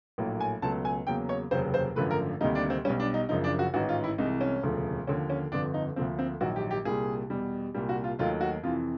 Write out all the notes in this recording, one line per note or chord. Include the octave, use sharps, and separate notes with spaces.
A#1 A2 F#3 A#3
G#5
C#2 B2 F#3 A3 A5
G#5
E2 C#3 F#3 A#3 G5
C#5
F1 D#2 C#3 F#3 C5
C5
G#1 F#2 D3 F3 A3 B4
A#4
D2 C3 D#3 G3 A#3 D#4
D4
C4
B1 B2 G3 C#4
D4
D#4
F#1 F#2 C#3 F3 D#4
D4
F#4
A1 G#2 D#3 F#4
F4
E4
C2 C3 E3 G#3 D#4
C#4
E1 D2 C#3 F3 A3
D#2 D3 F3 C#4
C#4
G1 F2 D3 F3 D4
D#4
D2 D3 F3 A#3 C4
C4
A#1 G#2 D#3 F#3 F#4
G4
G4
C2 A#2 G3 G#4
E2 B2 G3
C2 A#2 G3
F#4
F4
D#2 D#3 F#3 A3 F4
F#4
F2 C3 E3 F4